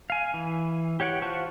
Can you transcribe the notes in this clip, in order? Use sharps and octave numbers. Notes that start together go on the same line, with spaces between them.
F5 G#5
E3
G4 C#5 F#5 G5
F4 C5 F#5 A5 C#6